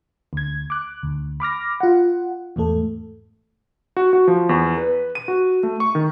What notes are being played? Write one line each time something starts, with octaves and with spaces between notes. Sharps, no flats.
D2 G#6
D6 F#6
D2
B5 D6 F6 A#6
F4 F#5
E2 G#2 A3 A4
F#4
F#4
F3
E2
B4
D#7
F#4
A3
C#6
D#3